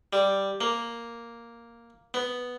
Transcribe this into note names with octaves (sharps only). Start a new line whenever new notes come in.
G3
A#3
B3